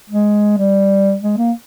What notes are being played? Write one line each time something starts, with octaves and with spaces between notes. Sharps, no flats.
G#3
G3
G#3
A#3